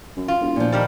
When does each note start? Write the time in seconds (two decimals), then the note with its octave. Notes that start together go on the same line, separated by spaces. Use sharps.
0.16 F#2
0.28 F4
0.41 E1
0.56 A#2 F3
0.72 D#3 G3 D4